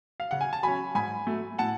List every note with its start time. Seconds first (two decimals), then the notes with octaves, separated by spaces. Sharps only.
0.20 F5
0.31 C#3 F#5
0.41 G#5
0.53 A5
0.63 F#3 C#4 G#5 B5
0.95 G#2 G#5 B5
1.26 F#3 A3
1.58 A2 F#5 A5